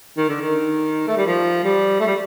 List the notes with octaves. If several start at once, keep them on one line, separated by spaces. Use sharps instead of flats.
D#3
D3
D#3
A3
G3
F3
G3
A3
G3